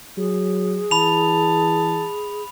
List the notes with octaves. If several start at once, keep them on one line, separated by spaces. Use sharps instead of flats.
F#3 G#4
E3 A5 B5 F7